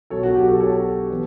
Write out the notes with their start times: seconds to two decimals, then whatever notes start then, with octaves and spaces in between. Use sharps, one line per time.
0.10 B1 B2 F#3 A4 C#5
0.23 F#4
0.35 G4
0.48 F#4 A4
0.61 A4 C#5
1.11 E3 B3